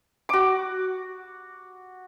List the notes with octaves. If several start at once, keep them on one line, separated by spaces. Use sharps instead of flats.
F#4 D6